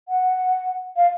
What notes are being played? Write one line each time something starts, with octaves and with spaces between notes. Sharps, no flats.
F#5
F5